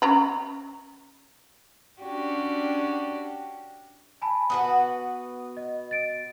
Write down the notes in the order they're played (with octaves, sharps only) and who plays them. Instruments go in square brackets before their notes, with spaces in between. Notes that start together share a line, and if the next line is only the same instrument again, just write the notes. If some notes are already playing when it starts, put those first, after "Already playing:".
[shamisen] C#4 A#5 B5
[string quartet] C#4 D4 F#4 G4
[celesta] G#5 A5 B5
[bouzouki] B3 F#4 B4 [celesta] D#6
[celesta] D#5
A6 D7